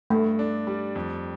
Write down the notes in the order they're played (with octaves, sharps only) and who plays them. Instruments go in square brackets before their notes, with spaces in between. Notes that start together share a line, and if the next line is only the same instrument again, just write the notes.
[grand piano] G2 [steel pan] A3
[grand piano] D4
G3
F2